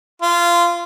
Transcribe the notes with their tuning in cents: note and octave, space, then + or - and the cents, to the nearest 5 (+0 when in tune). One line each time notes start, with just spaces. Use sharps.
F4 -20